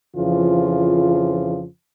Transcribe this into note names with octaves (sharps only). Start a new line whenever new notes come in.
F2 C#3 E3 F3 F4